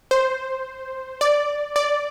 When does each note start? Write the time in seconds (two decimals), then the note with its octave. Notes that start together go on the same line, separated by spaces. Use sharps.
0.11 C5
1.21 D5
1.76 D5